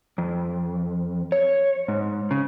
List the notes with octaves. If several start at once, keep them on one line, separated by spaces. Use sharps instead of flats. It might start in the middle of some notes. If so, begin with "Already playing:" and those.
F2
C#5
G#2
C#3